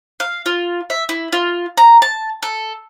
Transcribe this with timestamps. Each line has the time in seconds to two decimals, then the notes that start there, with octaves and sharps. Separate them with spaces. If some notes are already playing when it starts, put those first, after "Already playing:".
0.20 F5
0.46 F4
0.90 E5
1.09 E4
1.33 F4
1.77 A#5
2.02 A5
2.43 A4